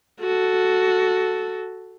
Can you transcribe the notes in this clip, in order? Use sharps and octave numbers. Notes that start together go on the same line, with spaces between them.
F#4 A4